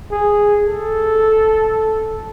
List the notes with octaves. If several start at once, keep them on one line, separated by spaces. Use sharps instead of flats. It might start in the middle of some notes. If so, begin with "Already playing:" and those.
G#4
A4